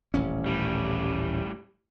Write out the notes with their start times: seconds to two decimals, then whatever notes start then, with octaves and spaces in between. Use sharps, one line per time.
0.14 D#1 A1 C#4
0.46 A2 G3